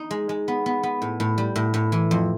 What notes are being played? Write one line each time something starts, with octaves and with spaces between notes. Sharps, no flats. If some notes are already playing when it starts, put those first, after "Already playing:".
Already playing: D#4
G#3
G#3
B3
B3
B3
A2
A2
G3
A2
A2
E3
F2